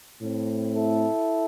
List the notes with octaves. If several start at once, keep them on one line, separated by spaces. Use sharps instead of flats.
A2 A3 C4
E4 A4